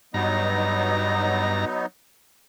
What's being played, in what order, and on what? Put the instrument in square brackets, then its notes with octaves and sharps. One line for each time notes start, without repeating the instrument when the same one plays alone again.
[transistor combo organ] G2 A#5 [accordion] F#3 B3 D#4